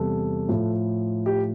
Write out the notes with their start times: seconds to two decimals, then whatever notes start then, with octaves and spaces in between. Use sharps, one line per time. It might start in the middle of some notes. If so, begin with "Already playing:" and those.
Already playing: E2 C3 G3 A4
0.48 A2 F3
1.26 G4